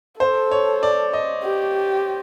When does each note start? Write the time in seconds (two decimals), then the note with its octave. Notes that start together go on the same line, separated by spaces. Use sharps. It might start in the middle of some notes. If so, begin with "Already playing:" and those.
0.20 A4 C5
0.51 C#5
0.83 D5
1.14 D#5
1.44 G4